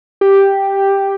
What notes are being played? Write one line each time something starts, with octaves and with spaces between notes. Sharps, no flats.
G4